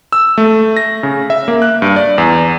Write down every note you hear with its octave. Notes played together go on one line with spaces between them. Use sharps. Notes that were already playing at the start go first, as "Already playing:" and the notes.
E6
A3
A#6
C#3
E5
A#3
F#6
G2
D5
E2